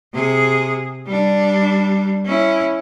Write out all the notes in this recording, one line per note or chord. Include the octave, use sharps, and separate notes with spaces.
C3 G#4
G3 D4
C#4 E4